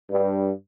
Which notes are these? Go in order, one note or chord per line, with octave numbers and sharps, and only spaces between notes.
G2